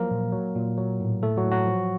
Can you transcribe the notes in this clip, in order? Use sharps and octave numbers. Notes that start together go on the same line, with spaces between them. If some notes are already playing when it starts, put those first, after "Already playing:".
Already playing: F3 F#3 A#3 A#4
A#2
F#3
A#2
F#3
A2
A2 A3 A4
F#3 F#4
A2
F#3 F#4
F3